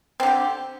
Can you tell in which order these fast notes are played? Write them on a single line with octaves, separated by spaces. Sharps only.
C4 D3 G4